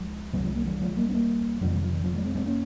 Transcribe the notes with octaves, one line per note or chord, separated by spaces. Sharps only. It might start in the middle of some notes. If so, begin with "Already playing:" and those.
Already playing: C#2 F3 G#3
C2 C3 E3 G3
F3 G#3
G3 A#3
E3 G3
F3 G#3
G3 A#3
C4
G3 A#3
F2 C3 F3 G#3
E3 G3
F3
E3
F3
F3 G#3
G#3 C4
G#3 C4
A#3 C#4